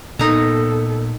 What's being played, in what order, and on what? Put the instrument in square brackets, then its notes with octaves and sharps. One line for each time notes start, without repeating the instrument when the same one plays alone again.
[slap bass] A#2 [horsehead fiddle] B3 A4 [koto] D#4 A#5